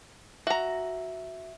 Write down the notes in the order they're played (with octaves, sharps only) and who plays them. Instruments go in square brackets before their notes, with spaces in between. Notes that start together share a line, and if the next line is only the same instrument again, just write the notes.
[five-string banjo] F#4 A#5 [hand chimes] E5